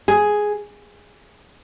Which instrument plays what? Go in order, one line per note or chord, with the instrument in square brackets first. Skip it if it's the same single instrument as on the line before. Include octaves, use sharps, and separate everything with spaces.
[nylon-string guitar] G#4